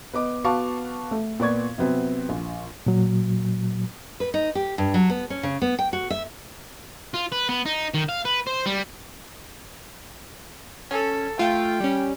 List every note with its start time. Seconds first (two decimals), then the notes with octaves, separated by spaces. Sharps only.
0.13 B3 D#5 D6
0.44 B3 F#4 F5 A5 C#6 D6
1.11 A3
1.40 A#2 B3 D5 C#6 G#6
1.78 C3 F#3 B3 C4
2.29 A#1
2.86 A#2 F#3
4.20 B4
4.34 D#4
4.55 G4
4.78 G2
4.94 F#3
5.10 B3
5.30 C#4
5.43 C#3
5.62 B3
5.79 G5
5.93 F#4
6.10 E5
7.14 F4
7.32 B4
7.49 B3
7.66 D#4
7.94 D#3
8.09 F5
8.25 B4
8.47 C5
8.66 G3
10.91 C#4 A4
11.39 A3 F4 G5
11.80 G3 C#4